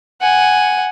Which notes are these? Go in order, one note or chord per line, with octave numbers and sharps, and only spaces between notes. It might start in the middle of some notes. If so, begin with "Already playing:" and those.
F#5 G#5